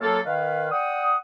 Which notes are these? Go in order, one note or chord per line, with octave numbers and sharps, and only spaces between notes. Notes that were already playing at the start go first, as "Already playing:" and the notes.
F#2 F#3 A#3 F4 A4
D#3 B4 F5
D5 F#5 G5 D#6